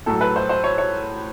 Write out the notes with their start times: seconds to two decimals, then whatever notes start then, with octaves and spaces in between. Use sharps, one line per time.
0.06 A2 F#3 A4
0.21 B4
0.36 C5
0.49 C5
0.64 C#5
0.78 C#5